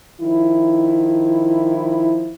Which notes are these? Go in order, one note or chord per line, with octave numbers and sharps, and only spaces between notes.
D#3 F3 E4